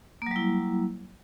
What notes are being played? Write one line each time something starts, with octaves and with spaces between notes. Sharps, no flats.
F#3 G3 A#3 E4